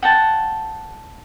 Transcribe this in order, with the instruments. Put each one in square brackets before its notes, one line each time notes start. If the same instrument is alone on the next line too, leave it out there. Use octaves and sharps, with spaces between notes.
[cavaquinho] F#5 G5 A5